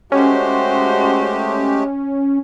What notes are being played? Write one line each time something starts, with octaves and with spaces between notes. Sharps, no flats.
G#3 A3 C#4 F#4 G4 C5